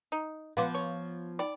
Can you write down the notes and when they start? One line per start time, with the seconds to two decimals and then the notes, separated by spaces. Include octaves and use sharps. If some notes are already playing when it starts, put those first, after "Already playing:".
0.12 D#4
0.57 F3 B3 F5 C6 D6
0.75 C#5
1.39 D#4 D5 G5 B5